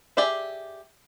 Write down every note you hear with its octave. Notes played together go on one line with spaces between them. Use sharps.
G4 G#4 D5 E5